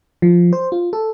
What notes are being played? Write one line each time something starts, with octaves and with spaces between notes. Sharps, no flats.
F3
C5
F4
A4